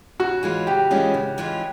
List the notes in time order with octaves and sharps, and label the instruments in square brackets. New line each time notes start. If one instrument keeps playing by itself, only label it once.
[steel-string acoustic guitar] C#3 [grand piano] F#4
[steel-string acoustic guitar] E3 G#3 C#4 F4
[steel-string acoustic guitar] C#3 [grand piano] G4
[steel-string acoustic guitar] E3 G#3 C#4 F4
C#3
E3 G#3 C#4 F4